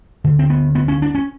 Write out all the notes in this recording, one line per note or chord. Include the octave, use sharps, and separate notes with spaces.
D2 D3
C4
B3
B3
C#4
D4
C#4